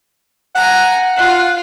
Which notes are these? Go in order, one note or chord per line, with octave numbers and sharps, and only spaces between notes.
F#5 G#5 A#5
F4